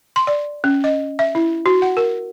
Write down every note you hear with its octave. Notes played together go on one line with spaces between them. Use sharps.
C6
D5
C#4
D#5
E5
E4
F#4
F#5
A#4